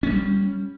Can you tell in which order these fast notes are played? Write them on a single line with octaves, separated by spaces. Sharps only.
C#4 G#3 G3